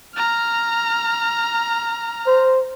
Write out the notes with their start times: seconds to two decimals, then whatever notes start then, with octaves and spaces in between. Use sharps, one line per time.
0.15 A#5 F6
2.27 C5